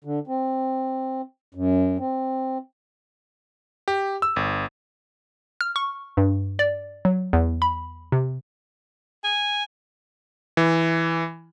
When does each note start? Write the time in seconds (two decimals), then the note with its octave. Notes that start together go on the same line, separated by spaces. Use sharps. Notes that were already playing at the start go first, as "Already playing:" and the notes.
0.04 D3
0.27 C4
1.55 F#2
1.99 C4
3.88 G4
4.22 E6
4.36 G1
5.61 F6
5.76 C#6
6.17 G2
6.59 D5
7.05 F#3
7.33 E2
7.62 B5
8.12 C3
9.24 G#5
10.57 E3